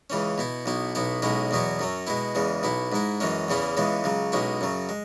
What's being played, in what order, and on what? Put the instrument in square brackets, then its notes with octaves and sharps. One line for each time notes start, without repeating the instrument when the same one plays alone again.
[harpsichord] C#2 C#3 E3 C#4
B2 B3 E4
B1 B2 B3 E4
B1 B2 B3 E4
B1 B2 G#3 C#4 E4
E2 B2 F#3 B3 E4
F#2 F#3 C#4
B2 G#3 B3 E4
E2 C#3 E3 G#3
B1 B2 B3 E4
G#2 G#3 E4
F#2 E3 G#3 C#4
E2 C#3 E3 C#4 E4
C#2 C#3 E3 G#3 B3
C#2 C#3 F#3
B1 B2 G#3 C#4 E4
F#2 C#3 F#3
G#3